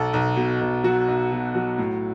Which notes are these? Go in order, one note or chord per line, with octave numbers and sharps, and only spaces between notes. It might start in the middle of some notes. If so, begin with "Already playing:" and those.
Already playing: B1 A4
B1
B2
B1
F#3 F#4
B1
B2
F#3
A2